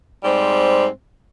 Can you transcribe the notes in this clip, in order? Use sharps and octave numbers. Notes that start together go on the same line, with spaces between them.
G#2 G3 C4